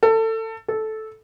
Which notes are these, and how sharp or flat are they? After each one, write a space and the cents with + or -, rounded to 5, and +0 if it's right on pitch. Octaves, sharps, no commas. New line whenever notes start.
A4 +25
A4 -10